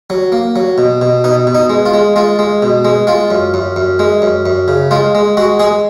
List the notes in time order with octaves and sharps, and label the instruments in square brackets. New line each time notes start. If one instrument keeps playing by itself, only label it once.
[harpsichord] F#3
A#3
F#3
B2
B2
B2 D#4
B2
D#4
G#3
F4
G#3
G#3 F4
G#3
B2
G#3
G#3 F4
F#2
F#2
F#2
G#3
F#2
F#2
C#3
G#3 F4
G#3
G#3 F#4
G#3 G#4